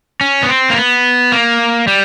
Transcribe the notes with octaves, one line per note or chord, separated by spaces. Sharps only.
C#4
B3
C4
A#3
B3
A#3
G3